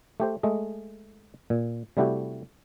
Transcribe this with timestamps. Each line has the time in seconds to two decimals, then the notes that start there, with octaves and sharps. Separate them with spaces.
0.20 A3 G4 C5
0.43 G#3 A3 D#5
1.50 A#2
1.97 C3 G3 A3 E4 F#4 G4